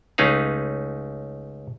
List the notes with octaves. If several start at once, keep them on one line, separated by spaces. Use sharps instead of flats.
C#2 A3 C#4 D#4 B4 F5